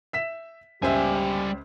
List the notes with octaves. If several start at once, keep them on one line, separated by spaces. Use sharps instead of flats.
E5 B6 E7
C#2 G3 G4 C5 E5 G#5